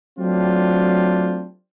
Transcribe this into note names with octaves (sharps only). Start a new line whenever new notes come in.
F#3 A3 C4 D4 F4 G4